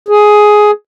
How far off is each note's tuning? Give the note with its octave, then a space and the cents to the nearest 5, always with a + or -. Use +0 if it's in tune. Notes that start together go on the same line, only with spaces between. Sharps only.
G#4 +10